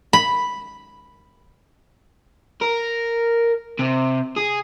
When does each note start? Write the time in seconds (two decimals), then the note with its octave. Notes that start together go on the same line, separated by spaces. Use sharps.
0.13 B5
2.62 A#4
3.79 C3
4.36 G#4